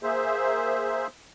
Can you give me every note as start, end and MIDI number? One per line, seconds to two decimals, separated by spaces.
0.03 1.07 58
0.03 1.07 68
0.03 1.07 72
0.03 1.07 76